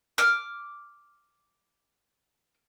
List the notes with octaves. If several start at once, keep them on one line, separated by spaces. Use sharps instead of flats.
D6 F6